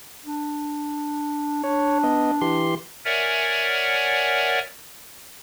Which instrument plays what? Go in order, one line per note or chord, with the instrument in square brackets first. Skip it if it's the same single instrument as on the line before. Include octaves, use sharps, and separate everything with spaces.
[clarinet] D4
[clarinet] D4 [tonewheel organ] C#5
[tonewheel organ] B3 D#5
E3 G4 C6
[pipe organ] A#4 C#5 D5 E5 F#5 G#5